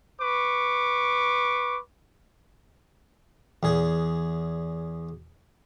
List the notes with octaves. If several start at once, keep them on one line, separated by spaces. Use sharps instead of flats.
B4 C#6 D6
E2 G#4